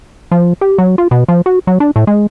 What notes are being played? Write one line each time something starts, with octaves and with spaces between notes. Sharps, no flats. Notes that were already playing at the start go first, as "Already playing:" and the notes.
F3
G4
F#3
F4
B2
F3
F#4
F#3
D4
A2
G#3